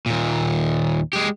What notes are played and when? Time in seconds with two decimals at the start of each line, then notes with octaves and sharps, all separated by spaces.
0.06 D#2 A#2
1.13 G#3 G4